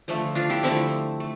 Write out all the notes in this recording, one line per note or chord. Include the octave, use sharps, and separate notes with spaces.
D3 F3 A3
D4 F4
E4 G4
D3 F3 A3 C4 E4
A3